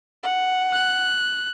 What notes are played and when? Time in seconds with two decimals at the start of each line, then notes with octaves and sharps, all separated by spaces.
0.23 F#5
0.73 F#6